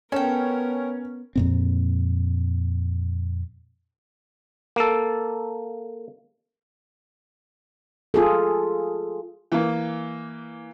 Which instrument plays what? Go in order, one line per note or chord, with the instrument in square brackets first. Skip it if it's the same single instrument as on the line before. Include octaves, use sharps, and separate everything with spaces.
[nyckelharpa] B3 A#4 [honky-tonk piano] C#4 [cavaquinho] A4 G5
[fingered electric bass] F2 A#2 C4
[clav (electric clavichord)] A#3 A4
[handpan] F4 G#4 A4
[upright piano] E3 A#3